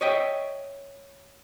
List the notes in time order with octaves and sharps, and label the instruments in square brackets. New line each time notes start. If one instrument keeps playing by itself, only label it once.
[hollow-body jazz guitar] C#5 D#5 E5 G5